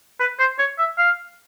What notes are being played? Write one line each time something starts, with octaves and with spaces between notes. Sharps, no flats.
B4
C5
C#5
E5
F5